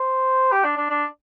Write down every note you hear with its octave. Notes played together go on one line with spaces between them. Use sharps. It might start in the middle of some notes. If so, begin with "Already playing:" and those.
Already playing: C5
G4
D4
D4
D4